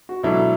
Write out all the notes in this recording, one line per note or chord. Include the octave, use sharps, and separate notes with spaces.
F#4
B2 F#3 D4 E4 A4